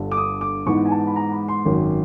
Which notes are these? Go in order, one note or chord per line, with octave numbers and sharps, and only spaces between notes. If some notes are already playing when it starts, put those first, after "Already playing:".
Already playing: G1 G2 D3 G3
D6
D#6
D6
G#2 E3 G#3 B3 D#4 C#6
G#5
A5
B5
A#5
B5
C6
G#1 F#2 D#3 F#3